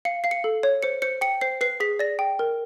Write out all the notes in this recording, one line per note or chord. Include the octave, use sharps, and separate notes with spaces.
F5 C#7
F5 C7
C#7
A4
C#5
C5 C#7
C5 C#7
G5 C#7
C5 C7
B4 C7
G#4 B6
D5 A#6
G5
A#4